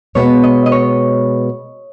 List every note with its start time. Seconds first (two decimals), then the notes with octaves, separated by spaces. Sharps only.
0.15 B2 G#3 B3 C#5
0.44 D#5
0.66 D#5
0.72 C#5